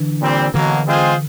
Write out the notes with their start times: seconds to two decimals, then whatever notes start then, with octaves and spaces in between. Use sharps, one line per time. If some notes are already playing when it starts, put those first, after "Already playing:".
Already playing: D3 E3
0.21 A#2 G3 C4
0.54 B2 D3 E3 F#3 A#3
0.87 G#3 C4 F4 G#4 C5